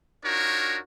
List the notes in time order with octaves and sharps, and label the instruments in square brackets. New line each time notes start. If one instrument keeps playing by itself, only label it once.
[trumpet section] D4 D#4 F4 F#4 A#4 C#5